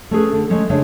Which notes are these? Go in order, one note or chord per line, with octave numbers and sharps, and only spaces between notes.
A3 C#4 G#4 B4
D3
G#3 A3 C#4
C#3 G#3 D4 C#5 E5